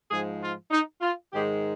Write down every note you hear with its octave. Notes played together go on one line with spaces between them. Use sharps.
G#2 F3 G#3 G#4
F4
D#4
F4
G#2 D#3 G#3 G4